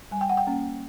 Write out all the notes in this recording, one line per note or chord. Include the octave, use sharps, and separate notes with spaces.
G3 G#5
G5
F#5
G5
A#3 C#4